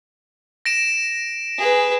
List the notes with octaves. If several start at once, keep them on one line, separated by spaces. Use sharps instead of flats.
A#6 D7 E7
G#4 B4